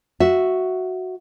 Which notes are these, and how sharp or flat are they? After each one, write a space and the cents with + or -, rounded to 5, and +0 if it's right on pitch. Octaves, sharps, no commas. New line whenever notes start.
F#4 +0 E5 +0